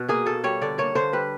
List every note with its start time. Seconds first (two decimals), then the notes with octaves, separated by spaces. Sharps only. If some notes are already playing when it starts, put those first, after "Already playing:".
Already playing: B2 F#4
0.09 A#3 G#4
0.26 B2 A4
0.44 G3 C#5
0.62 D3 D5
0.78 A#3 C#5
0.95 D3 C5
1.13 G3 B4